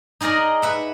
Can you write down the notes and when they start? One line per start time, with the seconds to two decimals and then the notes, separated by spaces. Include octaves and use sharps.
0.21 D#4 G#4 A#4 D5 D#5
0.62 B4 E5 F#5